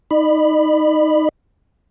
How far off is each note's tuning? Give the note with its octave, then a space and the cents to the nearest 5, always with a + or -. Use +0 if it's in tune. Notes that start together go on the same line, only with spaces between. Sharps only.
D#4 +10 D#5 -45 B5 +0